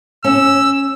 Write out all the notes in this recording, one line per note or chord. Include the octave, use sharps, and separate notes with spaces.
C#4 E6